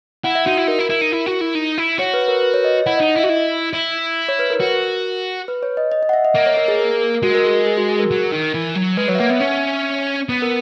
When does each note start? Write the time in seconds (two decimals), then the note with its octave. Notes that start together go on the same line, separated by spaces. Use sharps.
0.24 E4 F#5
0.35 E5
0.46 D#4 F#4
0.57 E4
0.67 D#4 A#4
0.79 E4
0.90 E4
1.01 D#4
1.12 E4
1.26 F#4
1.41 E4
1.55 D#4
1.78 E4
1.99 F#4 C#5
2.14 B4
2.28 A#4
2.43 B4
2.54 C#5
2.64 D#5
2.86 E4 F#5
2.97 D#5
3.00 D#4
3.08 D#5
3.16 E4
3.19 E5
3.23 F#4
3.29 E4
3.73 E4
4.29 C#5
4.39 B4
4.50 A#4
4.60 F#4
5.48 B4
5.63 C#5
5.77 D#5
5.92 D#5
6.03 D#5
6.09 F#5
6.13 E5
6.25 D#5
6.35 A#3 D#5
6.46 C#5
6.57 A#4
6.68 G#4
6.79 A#4
7.01 A#4
7.23 G#3 F#4
7.35 A#4
7.45 G#4
7.66 G#4
7.78 F#4
7.88 G#4
7.99 A#4
8.11 F#3
8.31 D#3
8.54 E3
8.75 F#3
8.97 G#3 B4
9.08 F#3 C#5
9.15 E5
9.19 A#3 F#5
9.30 B3 E5
9.41 C#4
10.29 B3
10.42 A#4